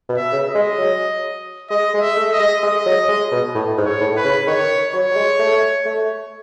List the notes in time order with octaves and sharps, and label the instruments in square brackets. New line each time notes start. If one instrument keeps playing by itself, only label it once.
[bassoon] B2
[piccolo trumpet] E5
[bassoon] C#3
[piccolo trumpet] D#5
[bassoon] G#3
F#3
[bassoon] G#3 [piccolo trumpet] D#5
[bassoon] G#3
[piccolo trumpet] E5
[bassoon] A3
[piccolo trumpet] D#5
[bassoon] G#3
[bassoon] G#3 [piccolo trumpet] D#5
[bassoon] F#3
G#3
B2
A2
G#2
[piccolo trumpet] C#5
[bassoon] A2
[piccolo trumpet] B4
[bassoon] C#3
[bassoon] D#3 [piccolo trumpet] C#5
[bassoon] F#3 [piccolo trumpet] C#5
[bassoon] F#3
G#3
A3
A3